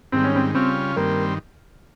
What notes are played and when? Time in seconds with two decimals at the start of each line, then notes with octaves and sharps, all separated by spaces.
0.12 G#2 D#3 G3 C4
0.24 C#4
0.36 C4
0.54 C#3 G3 C4 C#4 F4
0.96 G2 D#3 G3 A#3 C4